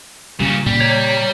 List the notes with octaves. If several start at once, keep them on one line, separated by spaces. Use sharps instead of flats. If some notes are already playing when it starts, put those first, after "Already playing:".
A#2 C#3 G3 C#4
A#2 C#3 G3
C#5 A#5